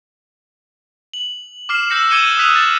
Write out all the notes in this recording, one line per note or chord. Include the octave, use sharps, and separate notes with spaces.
F#7
D6 F6 C7 E7
E6 G6 A#6 C#7
D6 G#6 C#7 D#7 E7 G7
D#6 E6 F#6 B6 D#7 F7
A6